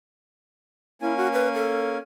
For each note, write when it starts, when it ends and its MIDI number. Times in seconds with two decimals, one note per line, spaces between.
1.02 1.98 58
1.02 1.98 61
1.02 1.16 64
1.02 1.98 80
1.17 1.28 66
1.33 1.48 71
1.54 1.94 69